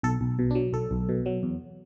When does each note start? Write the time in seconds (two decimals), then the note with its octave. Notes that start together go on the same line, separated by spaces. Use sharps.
0.03 B1 A4
0.21 B1
0.39 B2
0.51 D4
0.55 F#3
0.73 B1 A4
0.91 B1
1.09 B2
1.26 F#3
1.43 E2